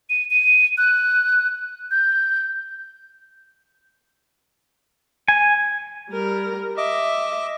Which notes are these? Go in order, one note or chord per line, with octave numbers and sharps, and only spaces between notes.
D#7
D#7
F#6
G6
G#5
G3 A#4
D#5 E5 D6